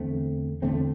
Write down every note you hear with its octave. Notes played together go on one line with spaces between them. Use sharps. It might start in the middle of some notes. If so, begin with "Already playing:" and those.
Already playing: E2 D3 A3 C4
E2 D3 A3 C4